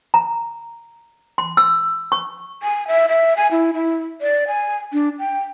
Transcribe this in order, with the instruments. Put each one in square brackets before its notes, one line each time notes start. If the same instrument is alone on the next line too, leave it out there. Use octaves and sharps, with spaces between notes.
[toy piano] A#5
C6
E6
C#6
[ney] G#5
E5
E5
G#5
E4
E4
D5
G#5
D4
G5